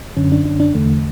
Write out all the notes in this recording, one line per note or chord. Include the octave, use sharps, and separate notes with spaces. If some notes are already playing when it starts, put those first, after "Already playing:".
F#2 D3 C#4
D4
D4
D4
E2 D3 A3